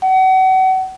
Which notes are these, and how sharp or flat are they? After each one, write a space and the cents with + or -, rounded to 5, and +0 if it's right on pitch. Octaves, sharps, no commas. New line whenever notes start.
F#5 +35